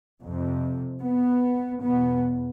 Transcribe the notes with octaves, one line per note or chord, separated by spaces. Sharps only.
F2 C3
B3
E2 B2 B3